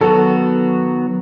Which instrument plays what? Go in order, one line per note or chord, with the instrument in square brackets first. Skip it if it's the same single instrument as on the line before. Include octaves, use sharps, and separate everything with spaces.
[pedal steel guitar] D#3 F#3 B3 F#4 [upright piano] A4